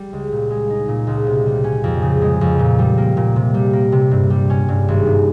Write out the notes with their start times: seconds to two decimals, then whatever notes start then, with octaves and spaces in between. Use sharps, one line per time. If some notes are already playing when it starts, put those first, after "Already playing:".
Already playing: G3
0.13 C#2
0.32 A#2
0.50 G#3
0.70 D#4
0.88 A#2
1.07 C#2
1.27 C3
1.46 G3
1.64 C#4
1.84 F2
2.02 C#3
2.22 G#3
2.41 F2
2.59 A#2
2.79 G3
2.98 A#3
3.17 A#2
3.36 C3
3.54 G3
3.73 A#3
3.92 C3
4.11 G2
4.30 G3
4.50 C#4
4.69 G2
4.88 G#1
5.06 G2